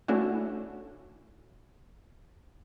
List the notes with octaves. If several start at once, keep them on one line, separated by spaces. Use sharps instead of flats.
A3 C#4 D4 E4 F#4